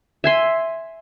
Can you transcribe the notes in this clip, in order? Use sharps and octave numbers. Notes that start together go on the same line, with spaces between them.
E5 G#5 C6